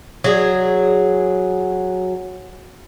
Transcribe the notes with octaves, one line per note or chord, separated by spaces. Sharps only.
F#3 G#4